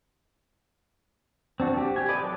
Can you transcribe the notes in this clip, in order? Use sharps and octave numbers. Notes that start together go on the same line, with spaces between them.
C4 D4 F#4
G4
G4 G#5
A4 B4 D5 D#5
F#3 A4